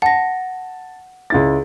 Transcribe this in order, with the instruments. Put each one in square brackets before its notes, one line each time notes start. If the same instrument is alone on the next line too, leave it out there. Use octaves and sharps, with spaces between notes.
[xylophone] F#5 A#6 [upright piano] A5
[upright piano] C#2 E4 A6